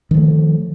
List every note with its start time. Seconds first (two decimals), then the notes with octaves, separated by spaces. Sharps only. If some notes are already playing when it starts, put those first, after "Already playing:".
0.11 D#3
0.14 F3
0.17 A3